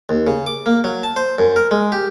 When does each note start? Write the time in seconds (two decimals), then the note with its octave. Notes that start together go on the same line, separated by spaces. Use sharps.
0.09 D#2
0.27 C#3
0.46 D6
0.66 A#3
0.84 F#3
1.03 A5
1.16 C5
1.39 F#2
1.56 A#4
1.71 G#3
1.92 G4